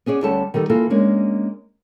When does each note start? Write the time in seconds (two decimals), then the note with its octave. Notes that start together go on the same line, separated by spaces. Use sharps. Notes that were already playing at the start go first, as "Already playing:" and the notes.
0.06 B3 C#4 G#4 D5
0.23 D2 D3 G3 C#4 A4 A5
0.54 D#3 G3 D#4 A4
0.70 E3 A#3 F4 A4 A#4
0.90 G#3 A#3 C#4 D4